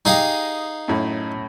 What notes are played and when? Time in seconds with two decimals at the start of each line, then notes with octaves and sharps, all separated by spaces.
0.05 D#4 G4 G#4 D#5 F5
0.88 F#2 A2